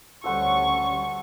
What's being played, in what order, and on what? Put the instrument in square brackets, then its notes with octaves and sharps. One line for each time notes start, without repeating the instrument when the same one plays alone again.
[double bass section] D2 G3 C#4 [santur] A4 C5 F#5 [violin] C#6